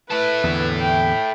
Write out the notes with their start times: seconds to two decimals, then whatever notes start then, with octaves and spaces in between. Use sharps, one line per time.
0.10 E4 A4 B4
0.44 E2 D3
0.82 G5